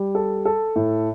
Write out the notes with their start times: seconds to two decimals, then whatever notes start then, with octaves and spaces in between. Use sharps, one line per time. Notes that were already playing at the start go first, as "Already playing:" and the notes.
Already playing: G3
0.15 A4
0.45 A4
0.76 A2